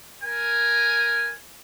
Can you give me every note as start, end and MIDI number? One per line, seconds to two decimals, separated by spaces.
0.23 1.32 70
0.23 1.32 80